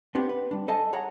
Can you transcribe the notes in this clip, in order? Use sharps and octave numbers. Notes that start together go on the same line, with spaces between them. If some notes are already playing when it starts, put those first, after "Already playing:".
B3 C4 D4 G4
B4
G3 D4
A4 C5 D#5 G#5 A5
G#4 C#5 F#5 A#5